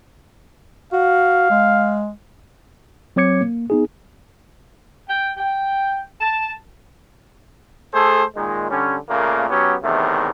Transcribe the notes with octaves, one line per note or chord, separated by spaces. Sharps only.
F#4 F5
G#3
F#3 C4 C#5 D6 G#6 C#7
A#3
B3 D#4 G#4
G5
G5
A5
A3 G#4 A4 C5
A#2 D#3 G#3
D3 G3 C#4
A#2 C#3 A3 A#3
F#3 B3 C#4 G4
E2 A2 C3 D#3